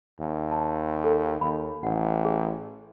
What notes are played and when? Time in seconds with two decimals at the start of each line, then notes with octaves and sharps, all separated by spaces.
0.20 D#2
0.52 A5
1.04 A4
1.41 D#2 B5
1.83 A1 F#5
2.25 G#4